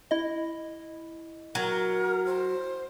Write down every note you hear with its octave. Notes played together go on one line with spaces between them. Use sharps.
E4 D#5
F#3 A#4
C5